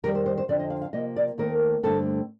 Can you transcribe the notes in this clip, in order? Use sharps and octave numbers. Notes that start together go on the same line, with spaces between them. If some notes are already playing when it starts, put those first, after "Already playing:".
F2 D#3 G3 A#4
C5
C5
C5
F2 D3 F3 C4 D5
D#5
F5
F5
C3 F3 A#3 D#5
D5
D#2 D#3 A3 C4 A#4
G2 D3 A3 C4 A4